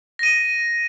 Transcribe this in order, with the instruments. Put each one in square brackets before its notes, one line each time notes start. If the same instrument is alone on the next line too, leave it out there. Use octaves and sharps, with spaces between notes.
[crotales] A#6 D#7